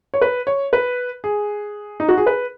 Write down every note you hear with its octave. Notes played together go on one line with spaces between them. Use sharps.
C#5
B4
C#5
B4
G#4
D#4
F#4
G#4
B4